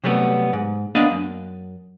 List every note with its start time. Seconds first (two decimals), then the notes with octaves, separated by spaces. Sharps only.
0.04 C3 F#3 G3 A3 B3
0.53 G#2
0.95 A#3 B3 D4 D5 D#5 F5
1.11 F#2